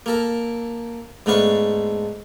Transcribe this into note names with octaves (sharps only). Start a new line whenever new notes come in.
A#3 A4 A#4
G#2 A3 B3 D4 F5 C#6